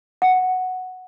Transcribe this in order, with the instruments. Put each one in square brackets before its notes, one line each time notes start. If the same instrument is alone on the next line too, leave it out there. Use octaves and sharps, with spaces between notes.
[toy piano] F#5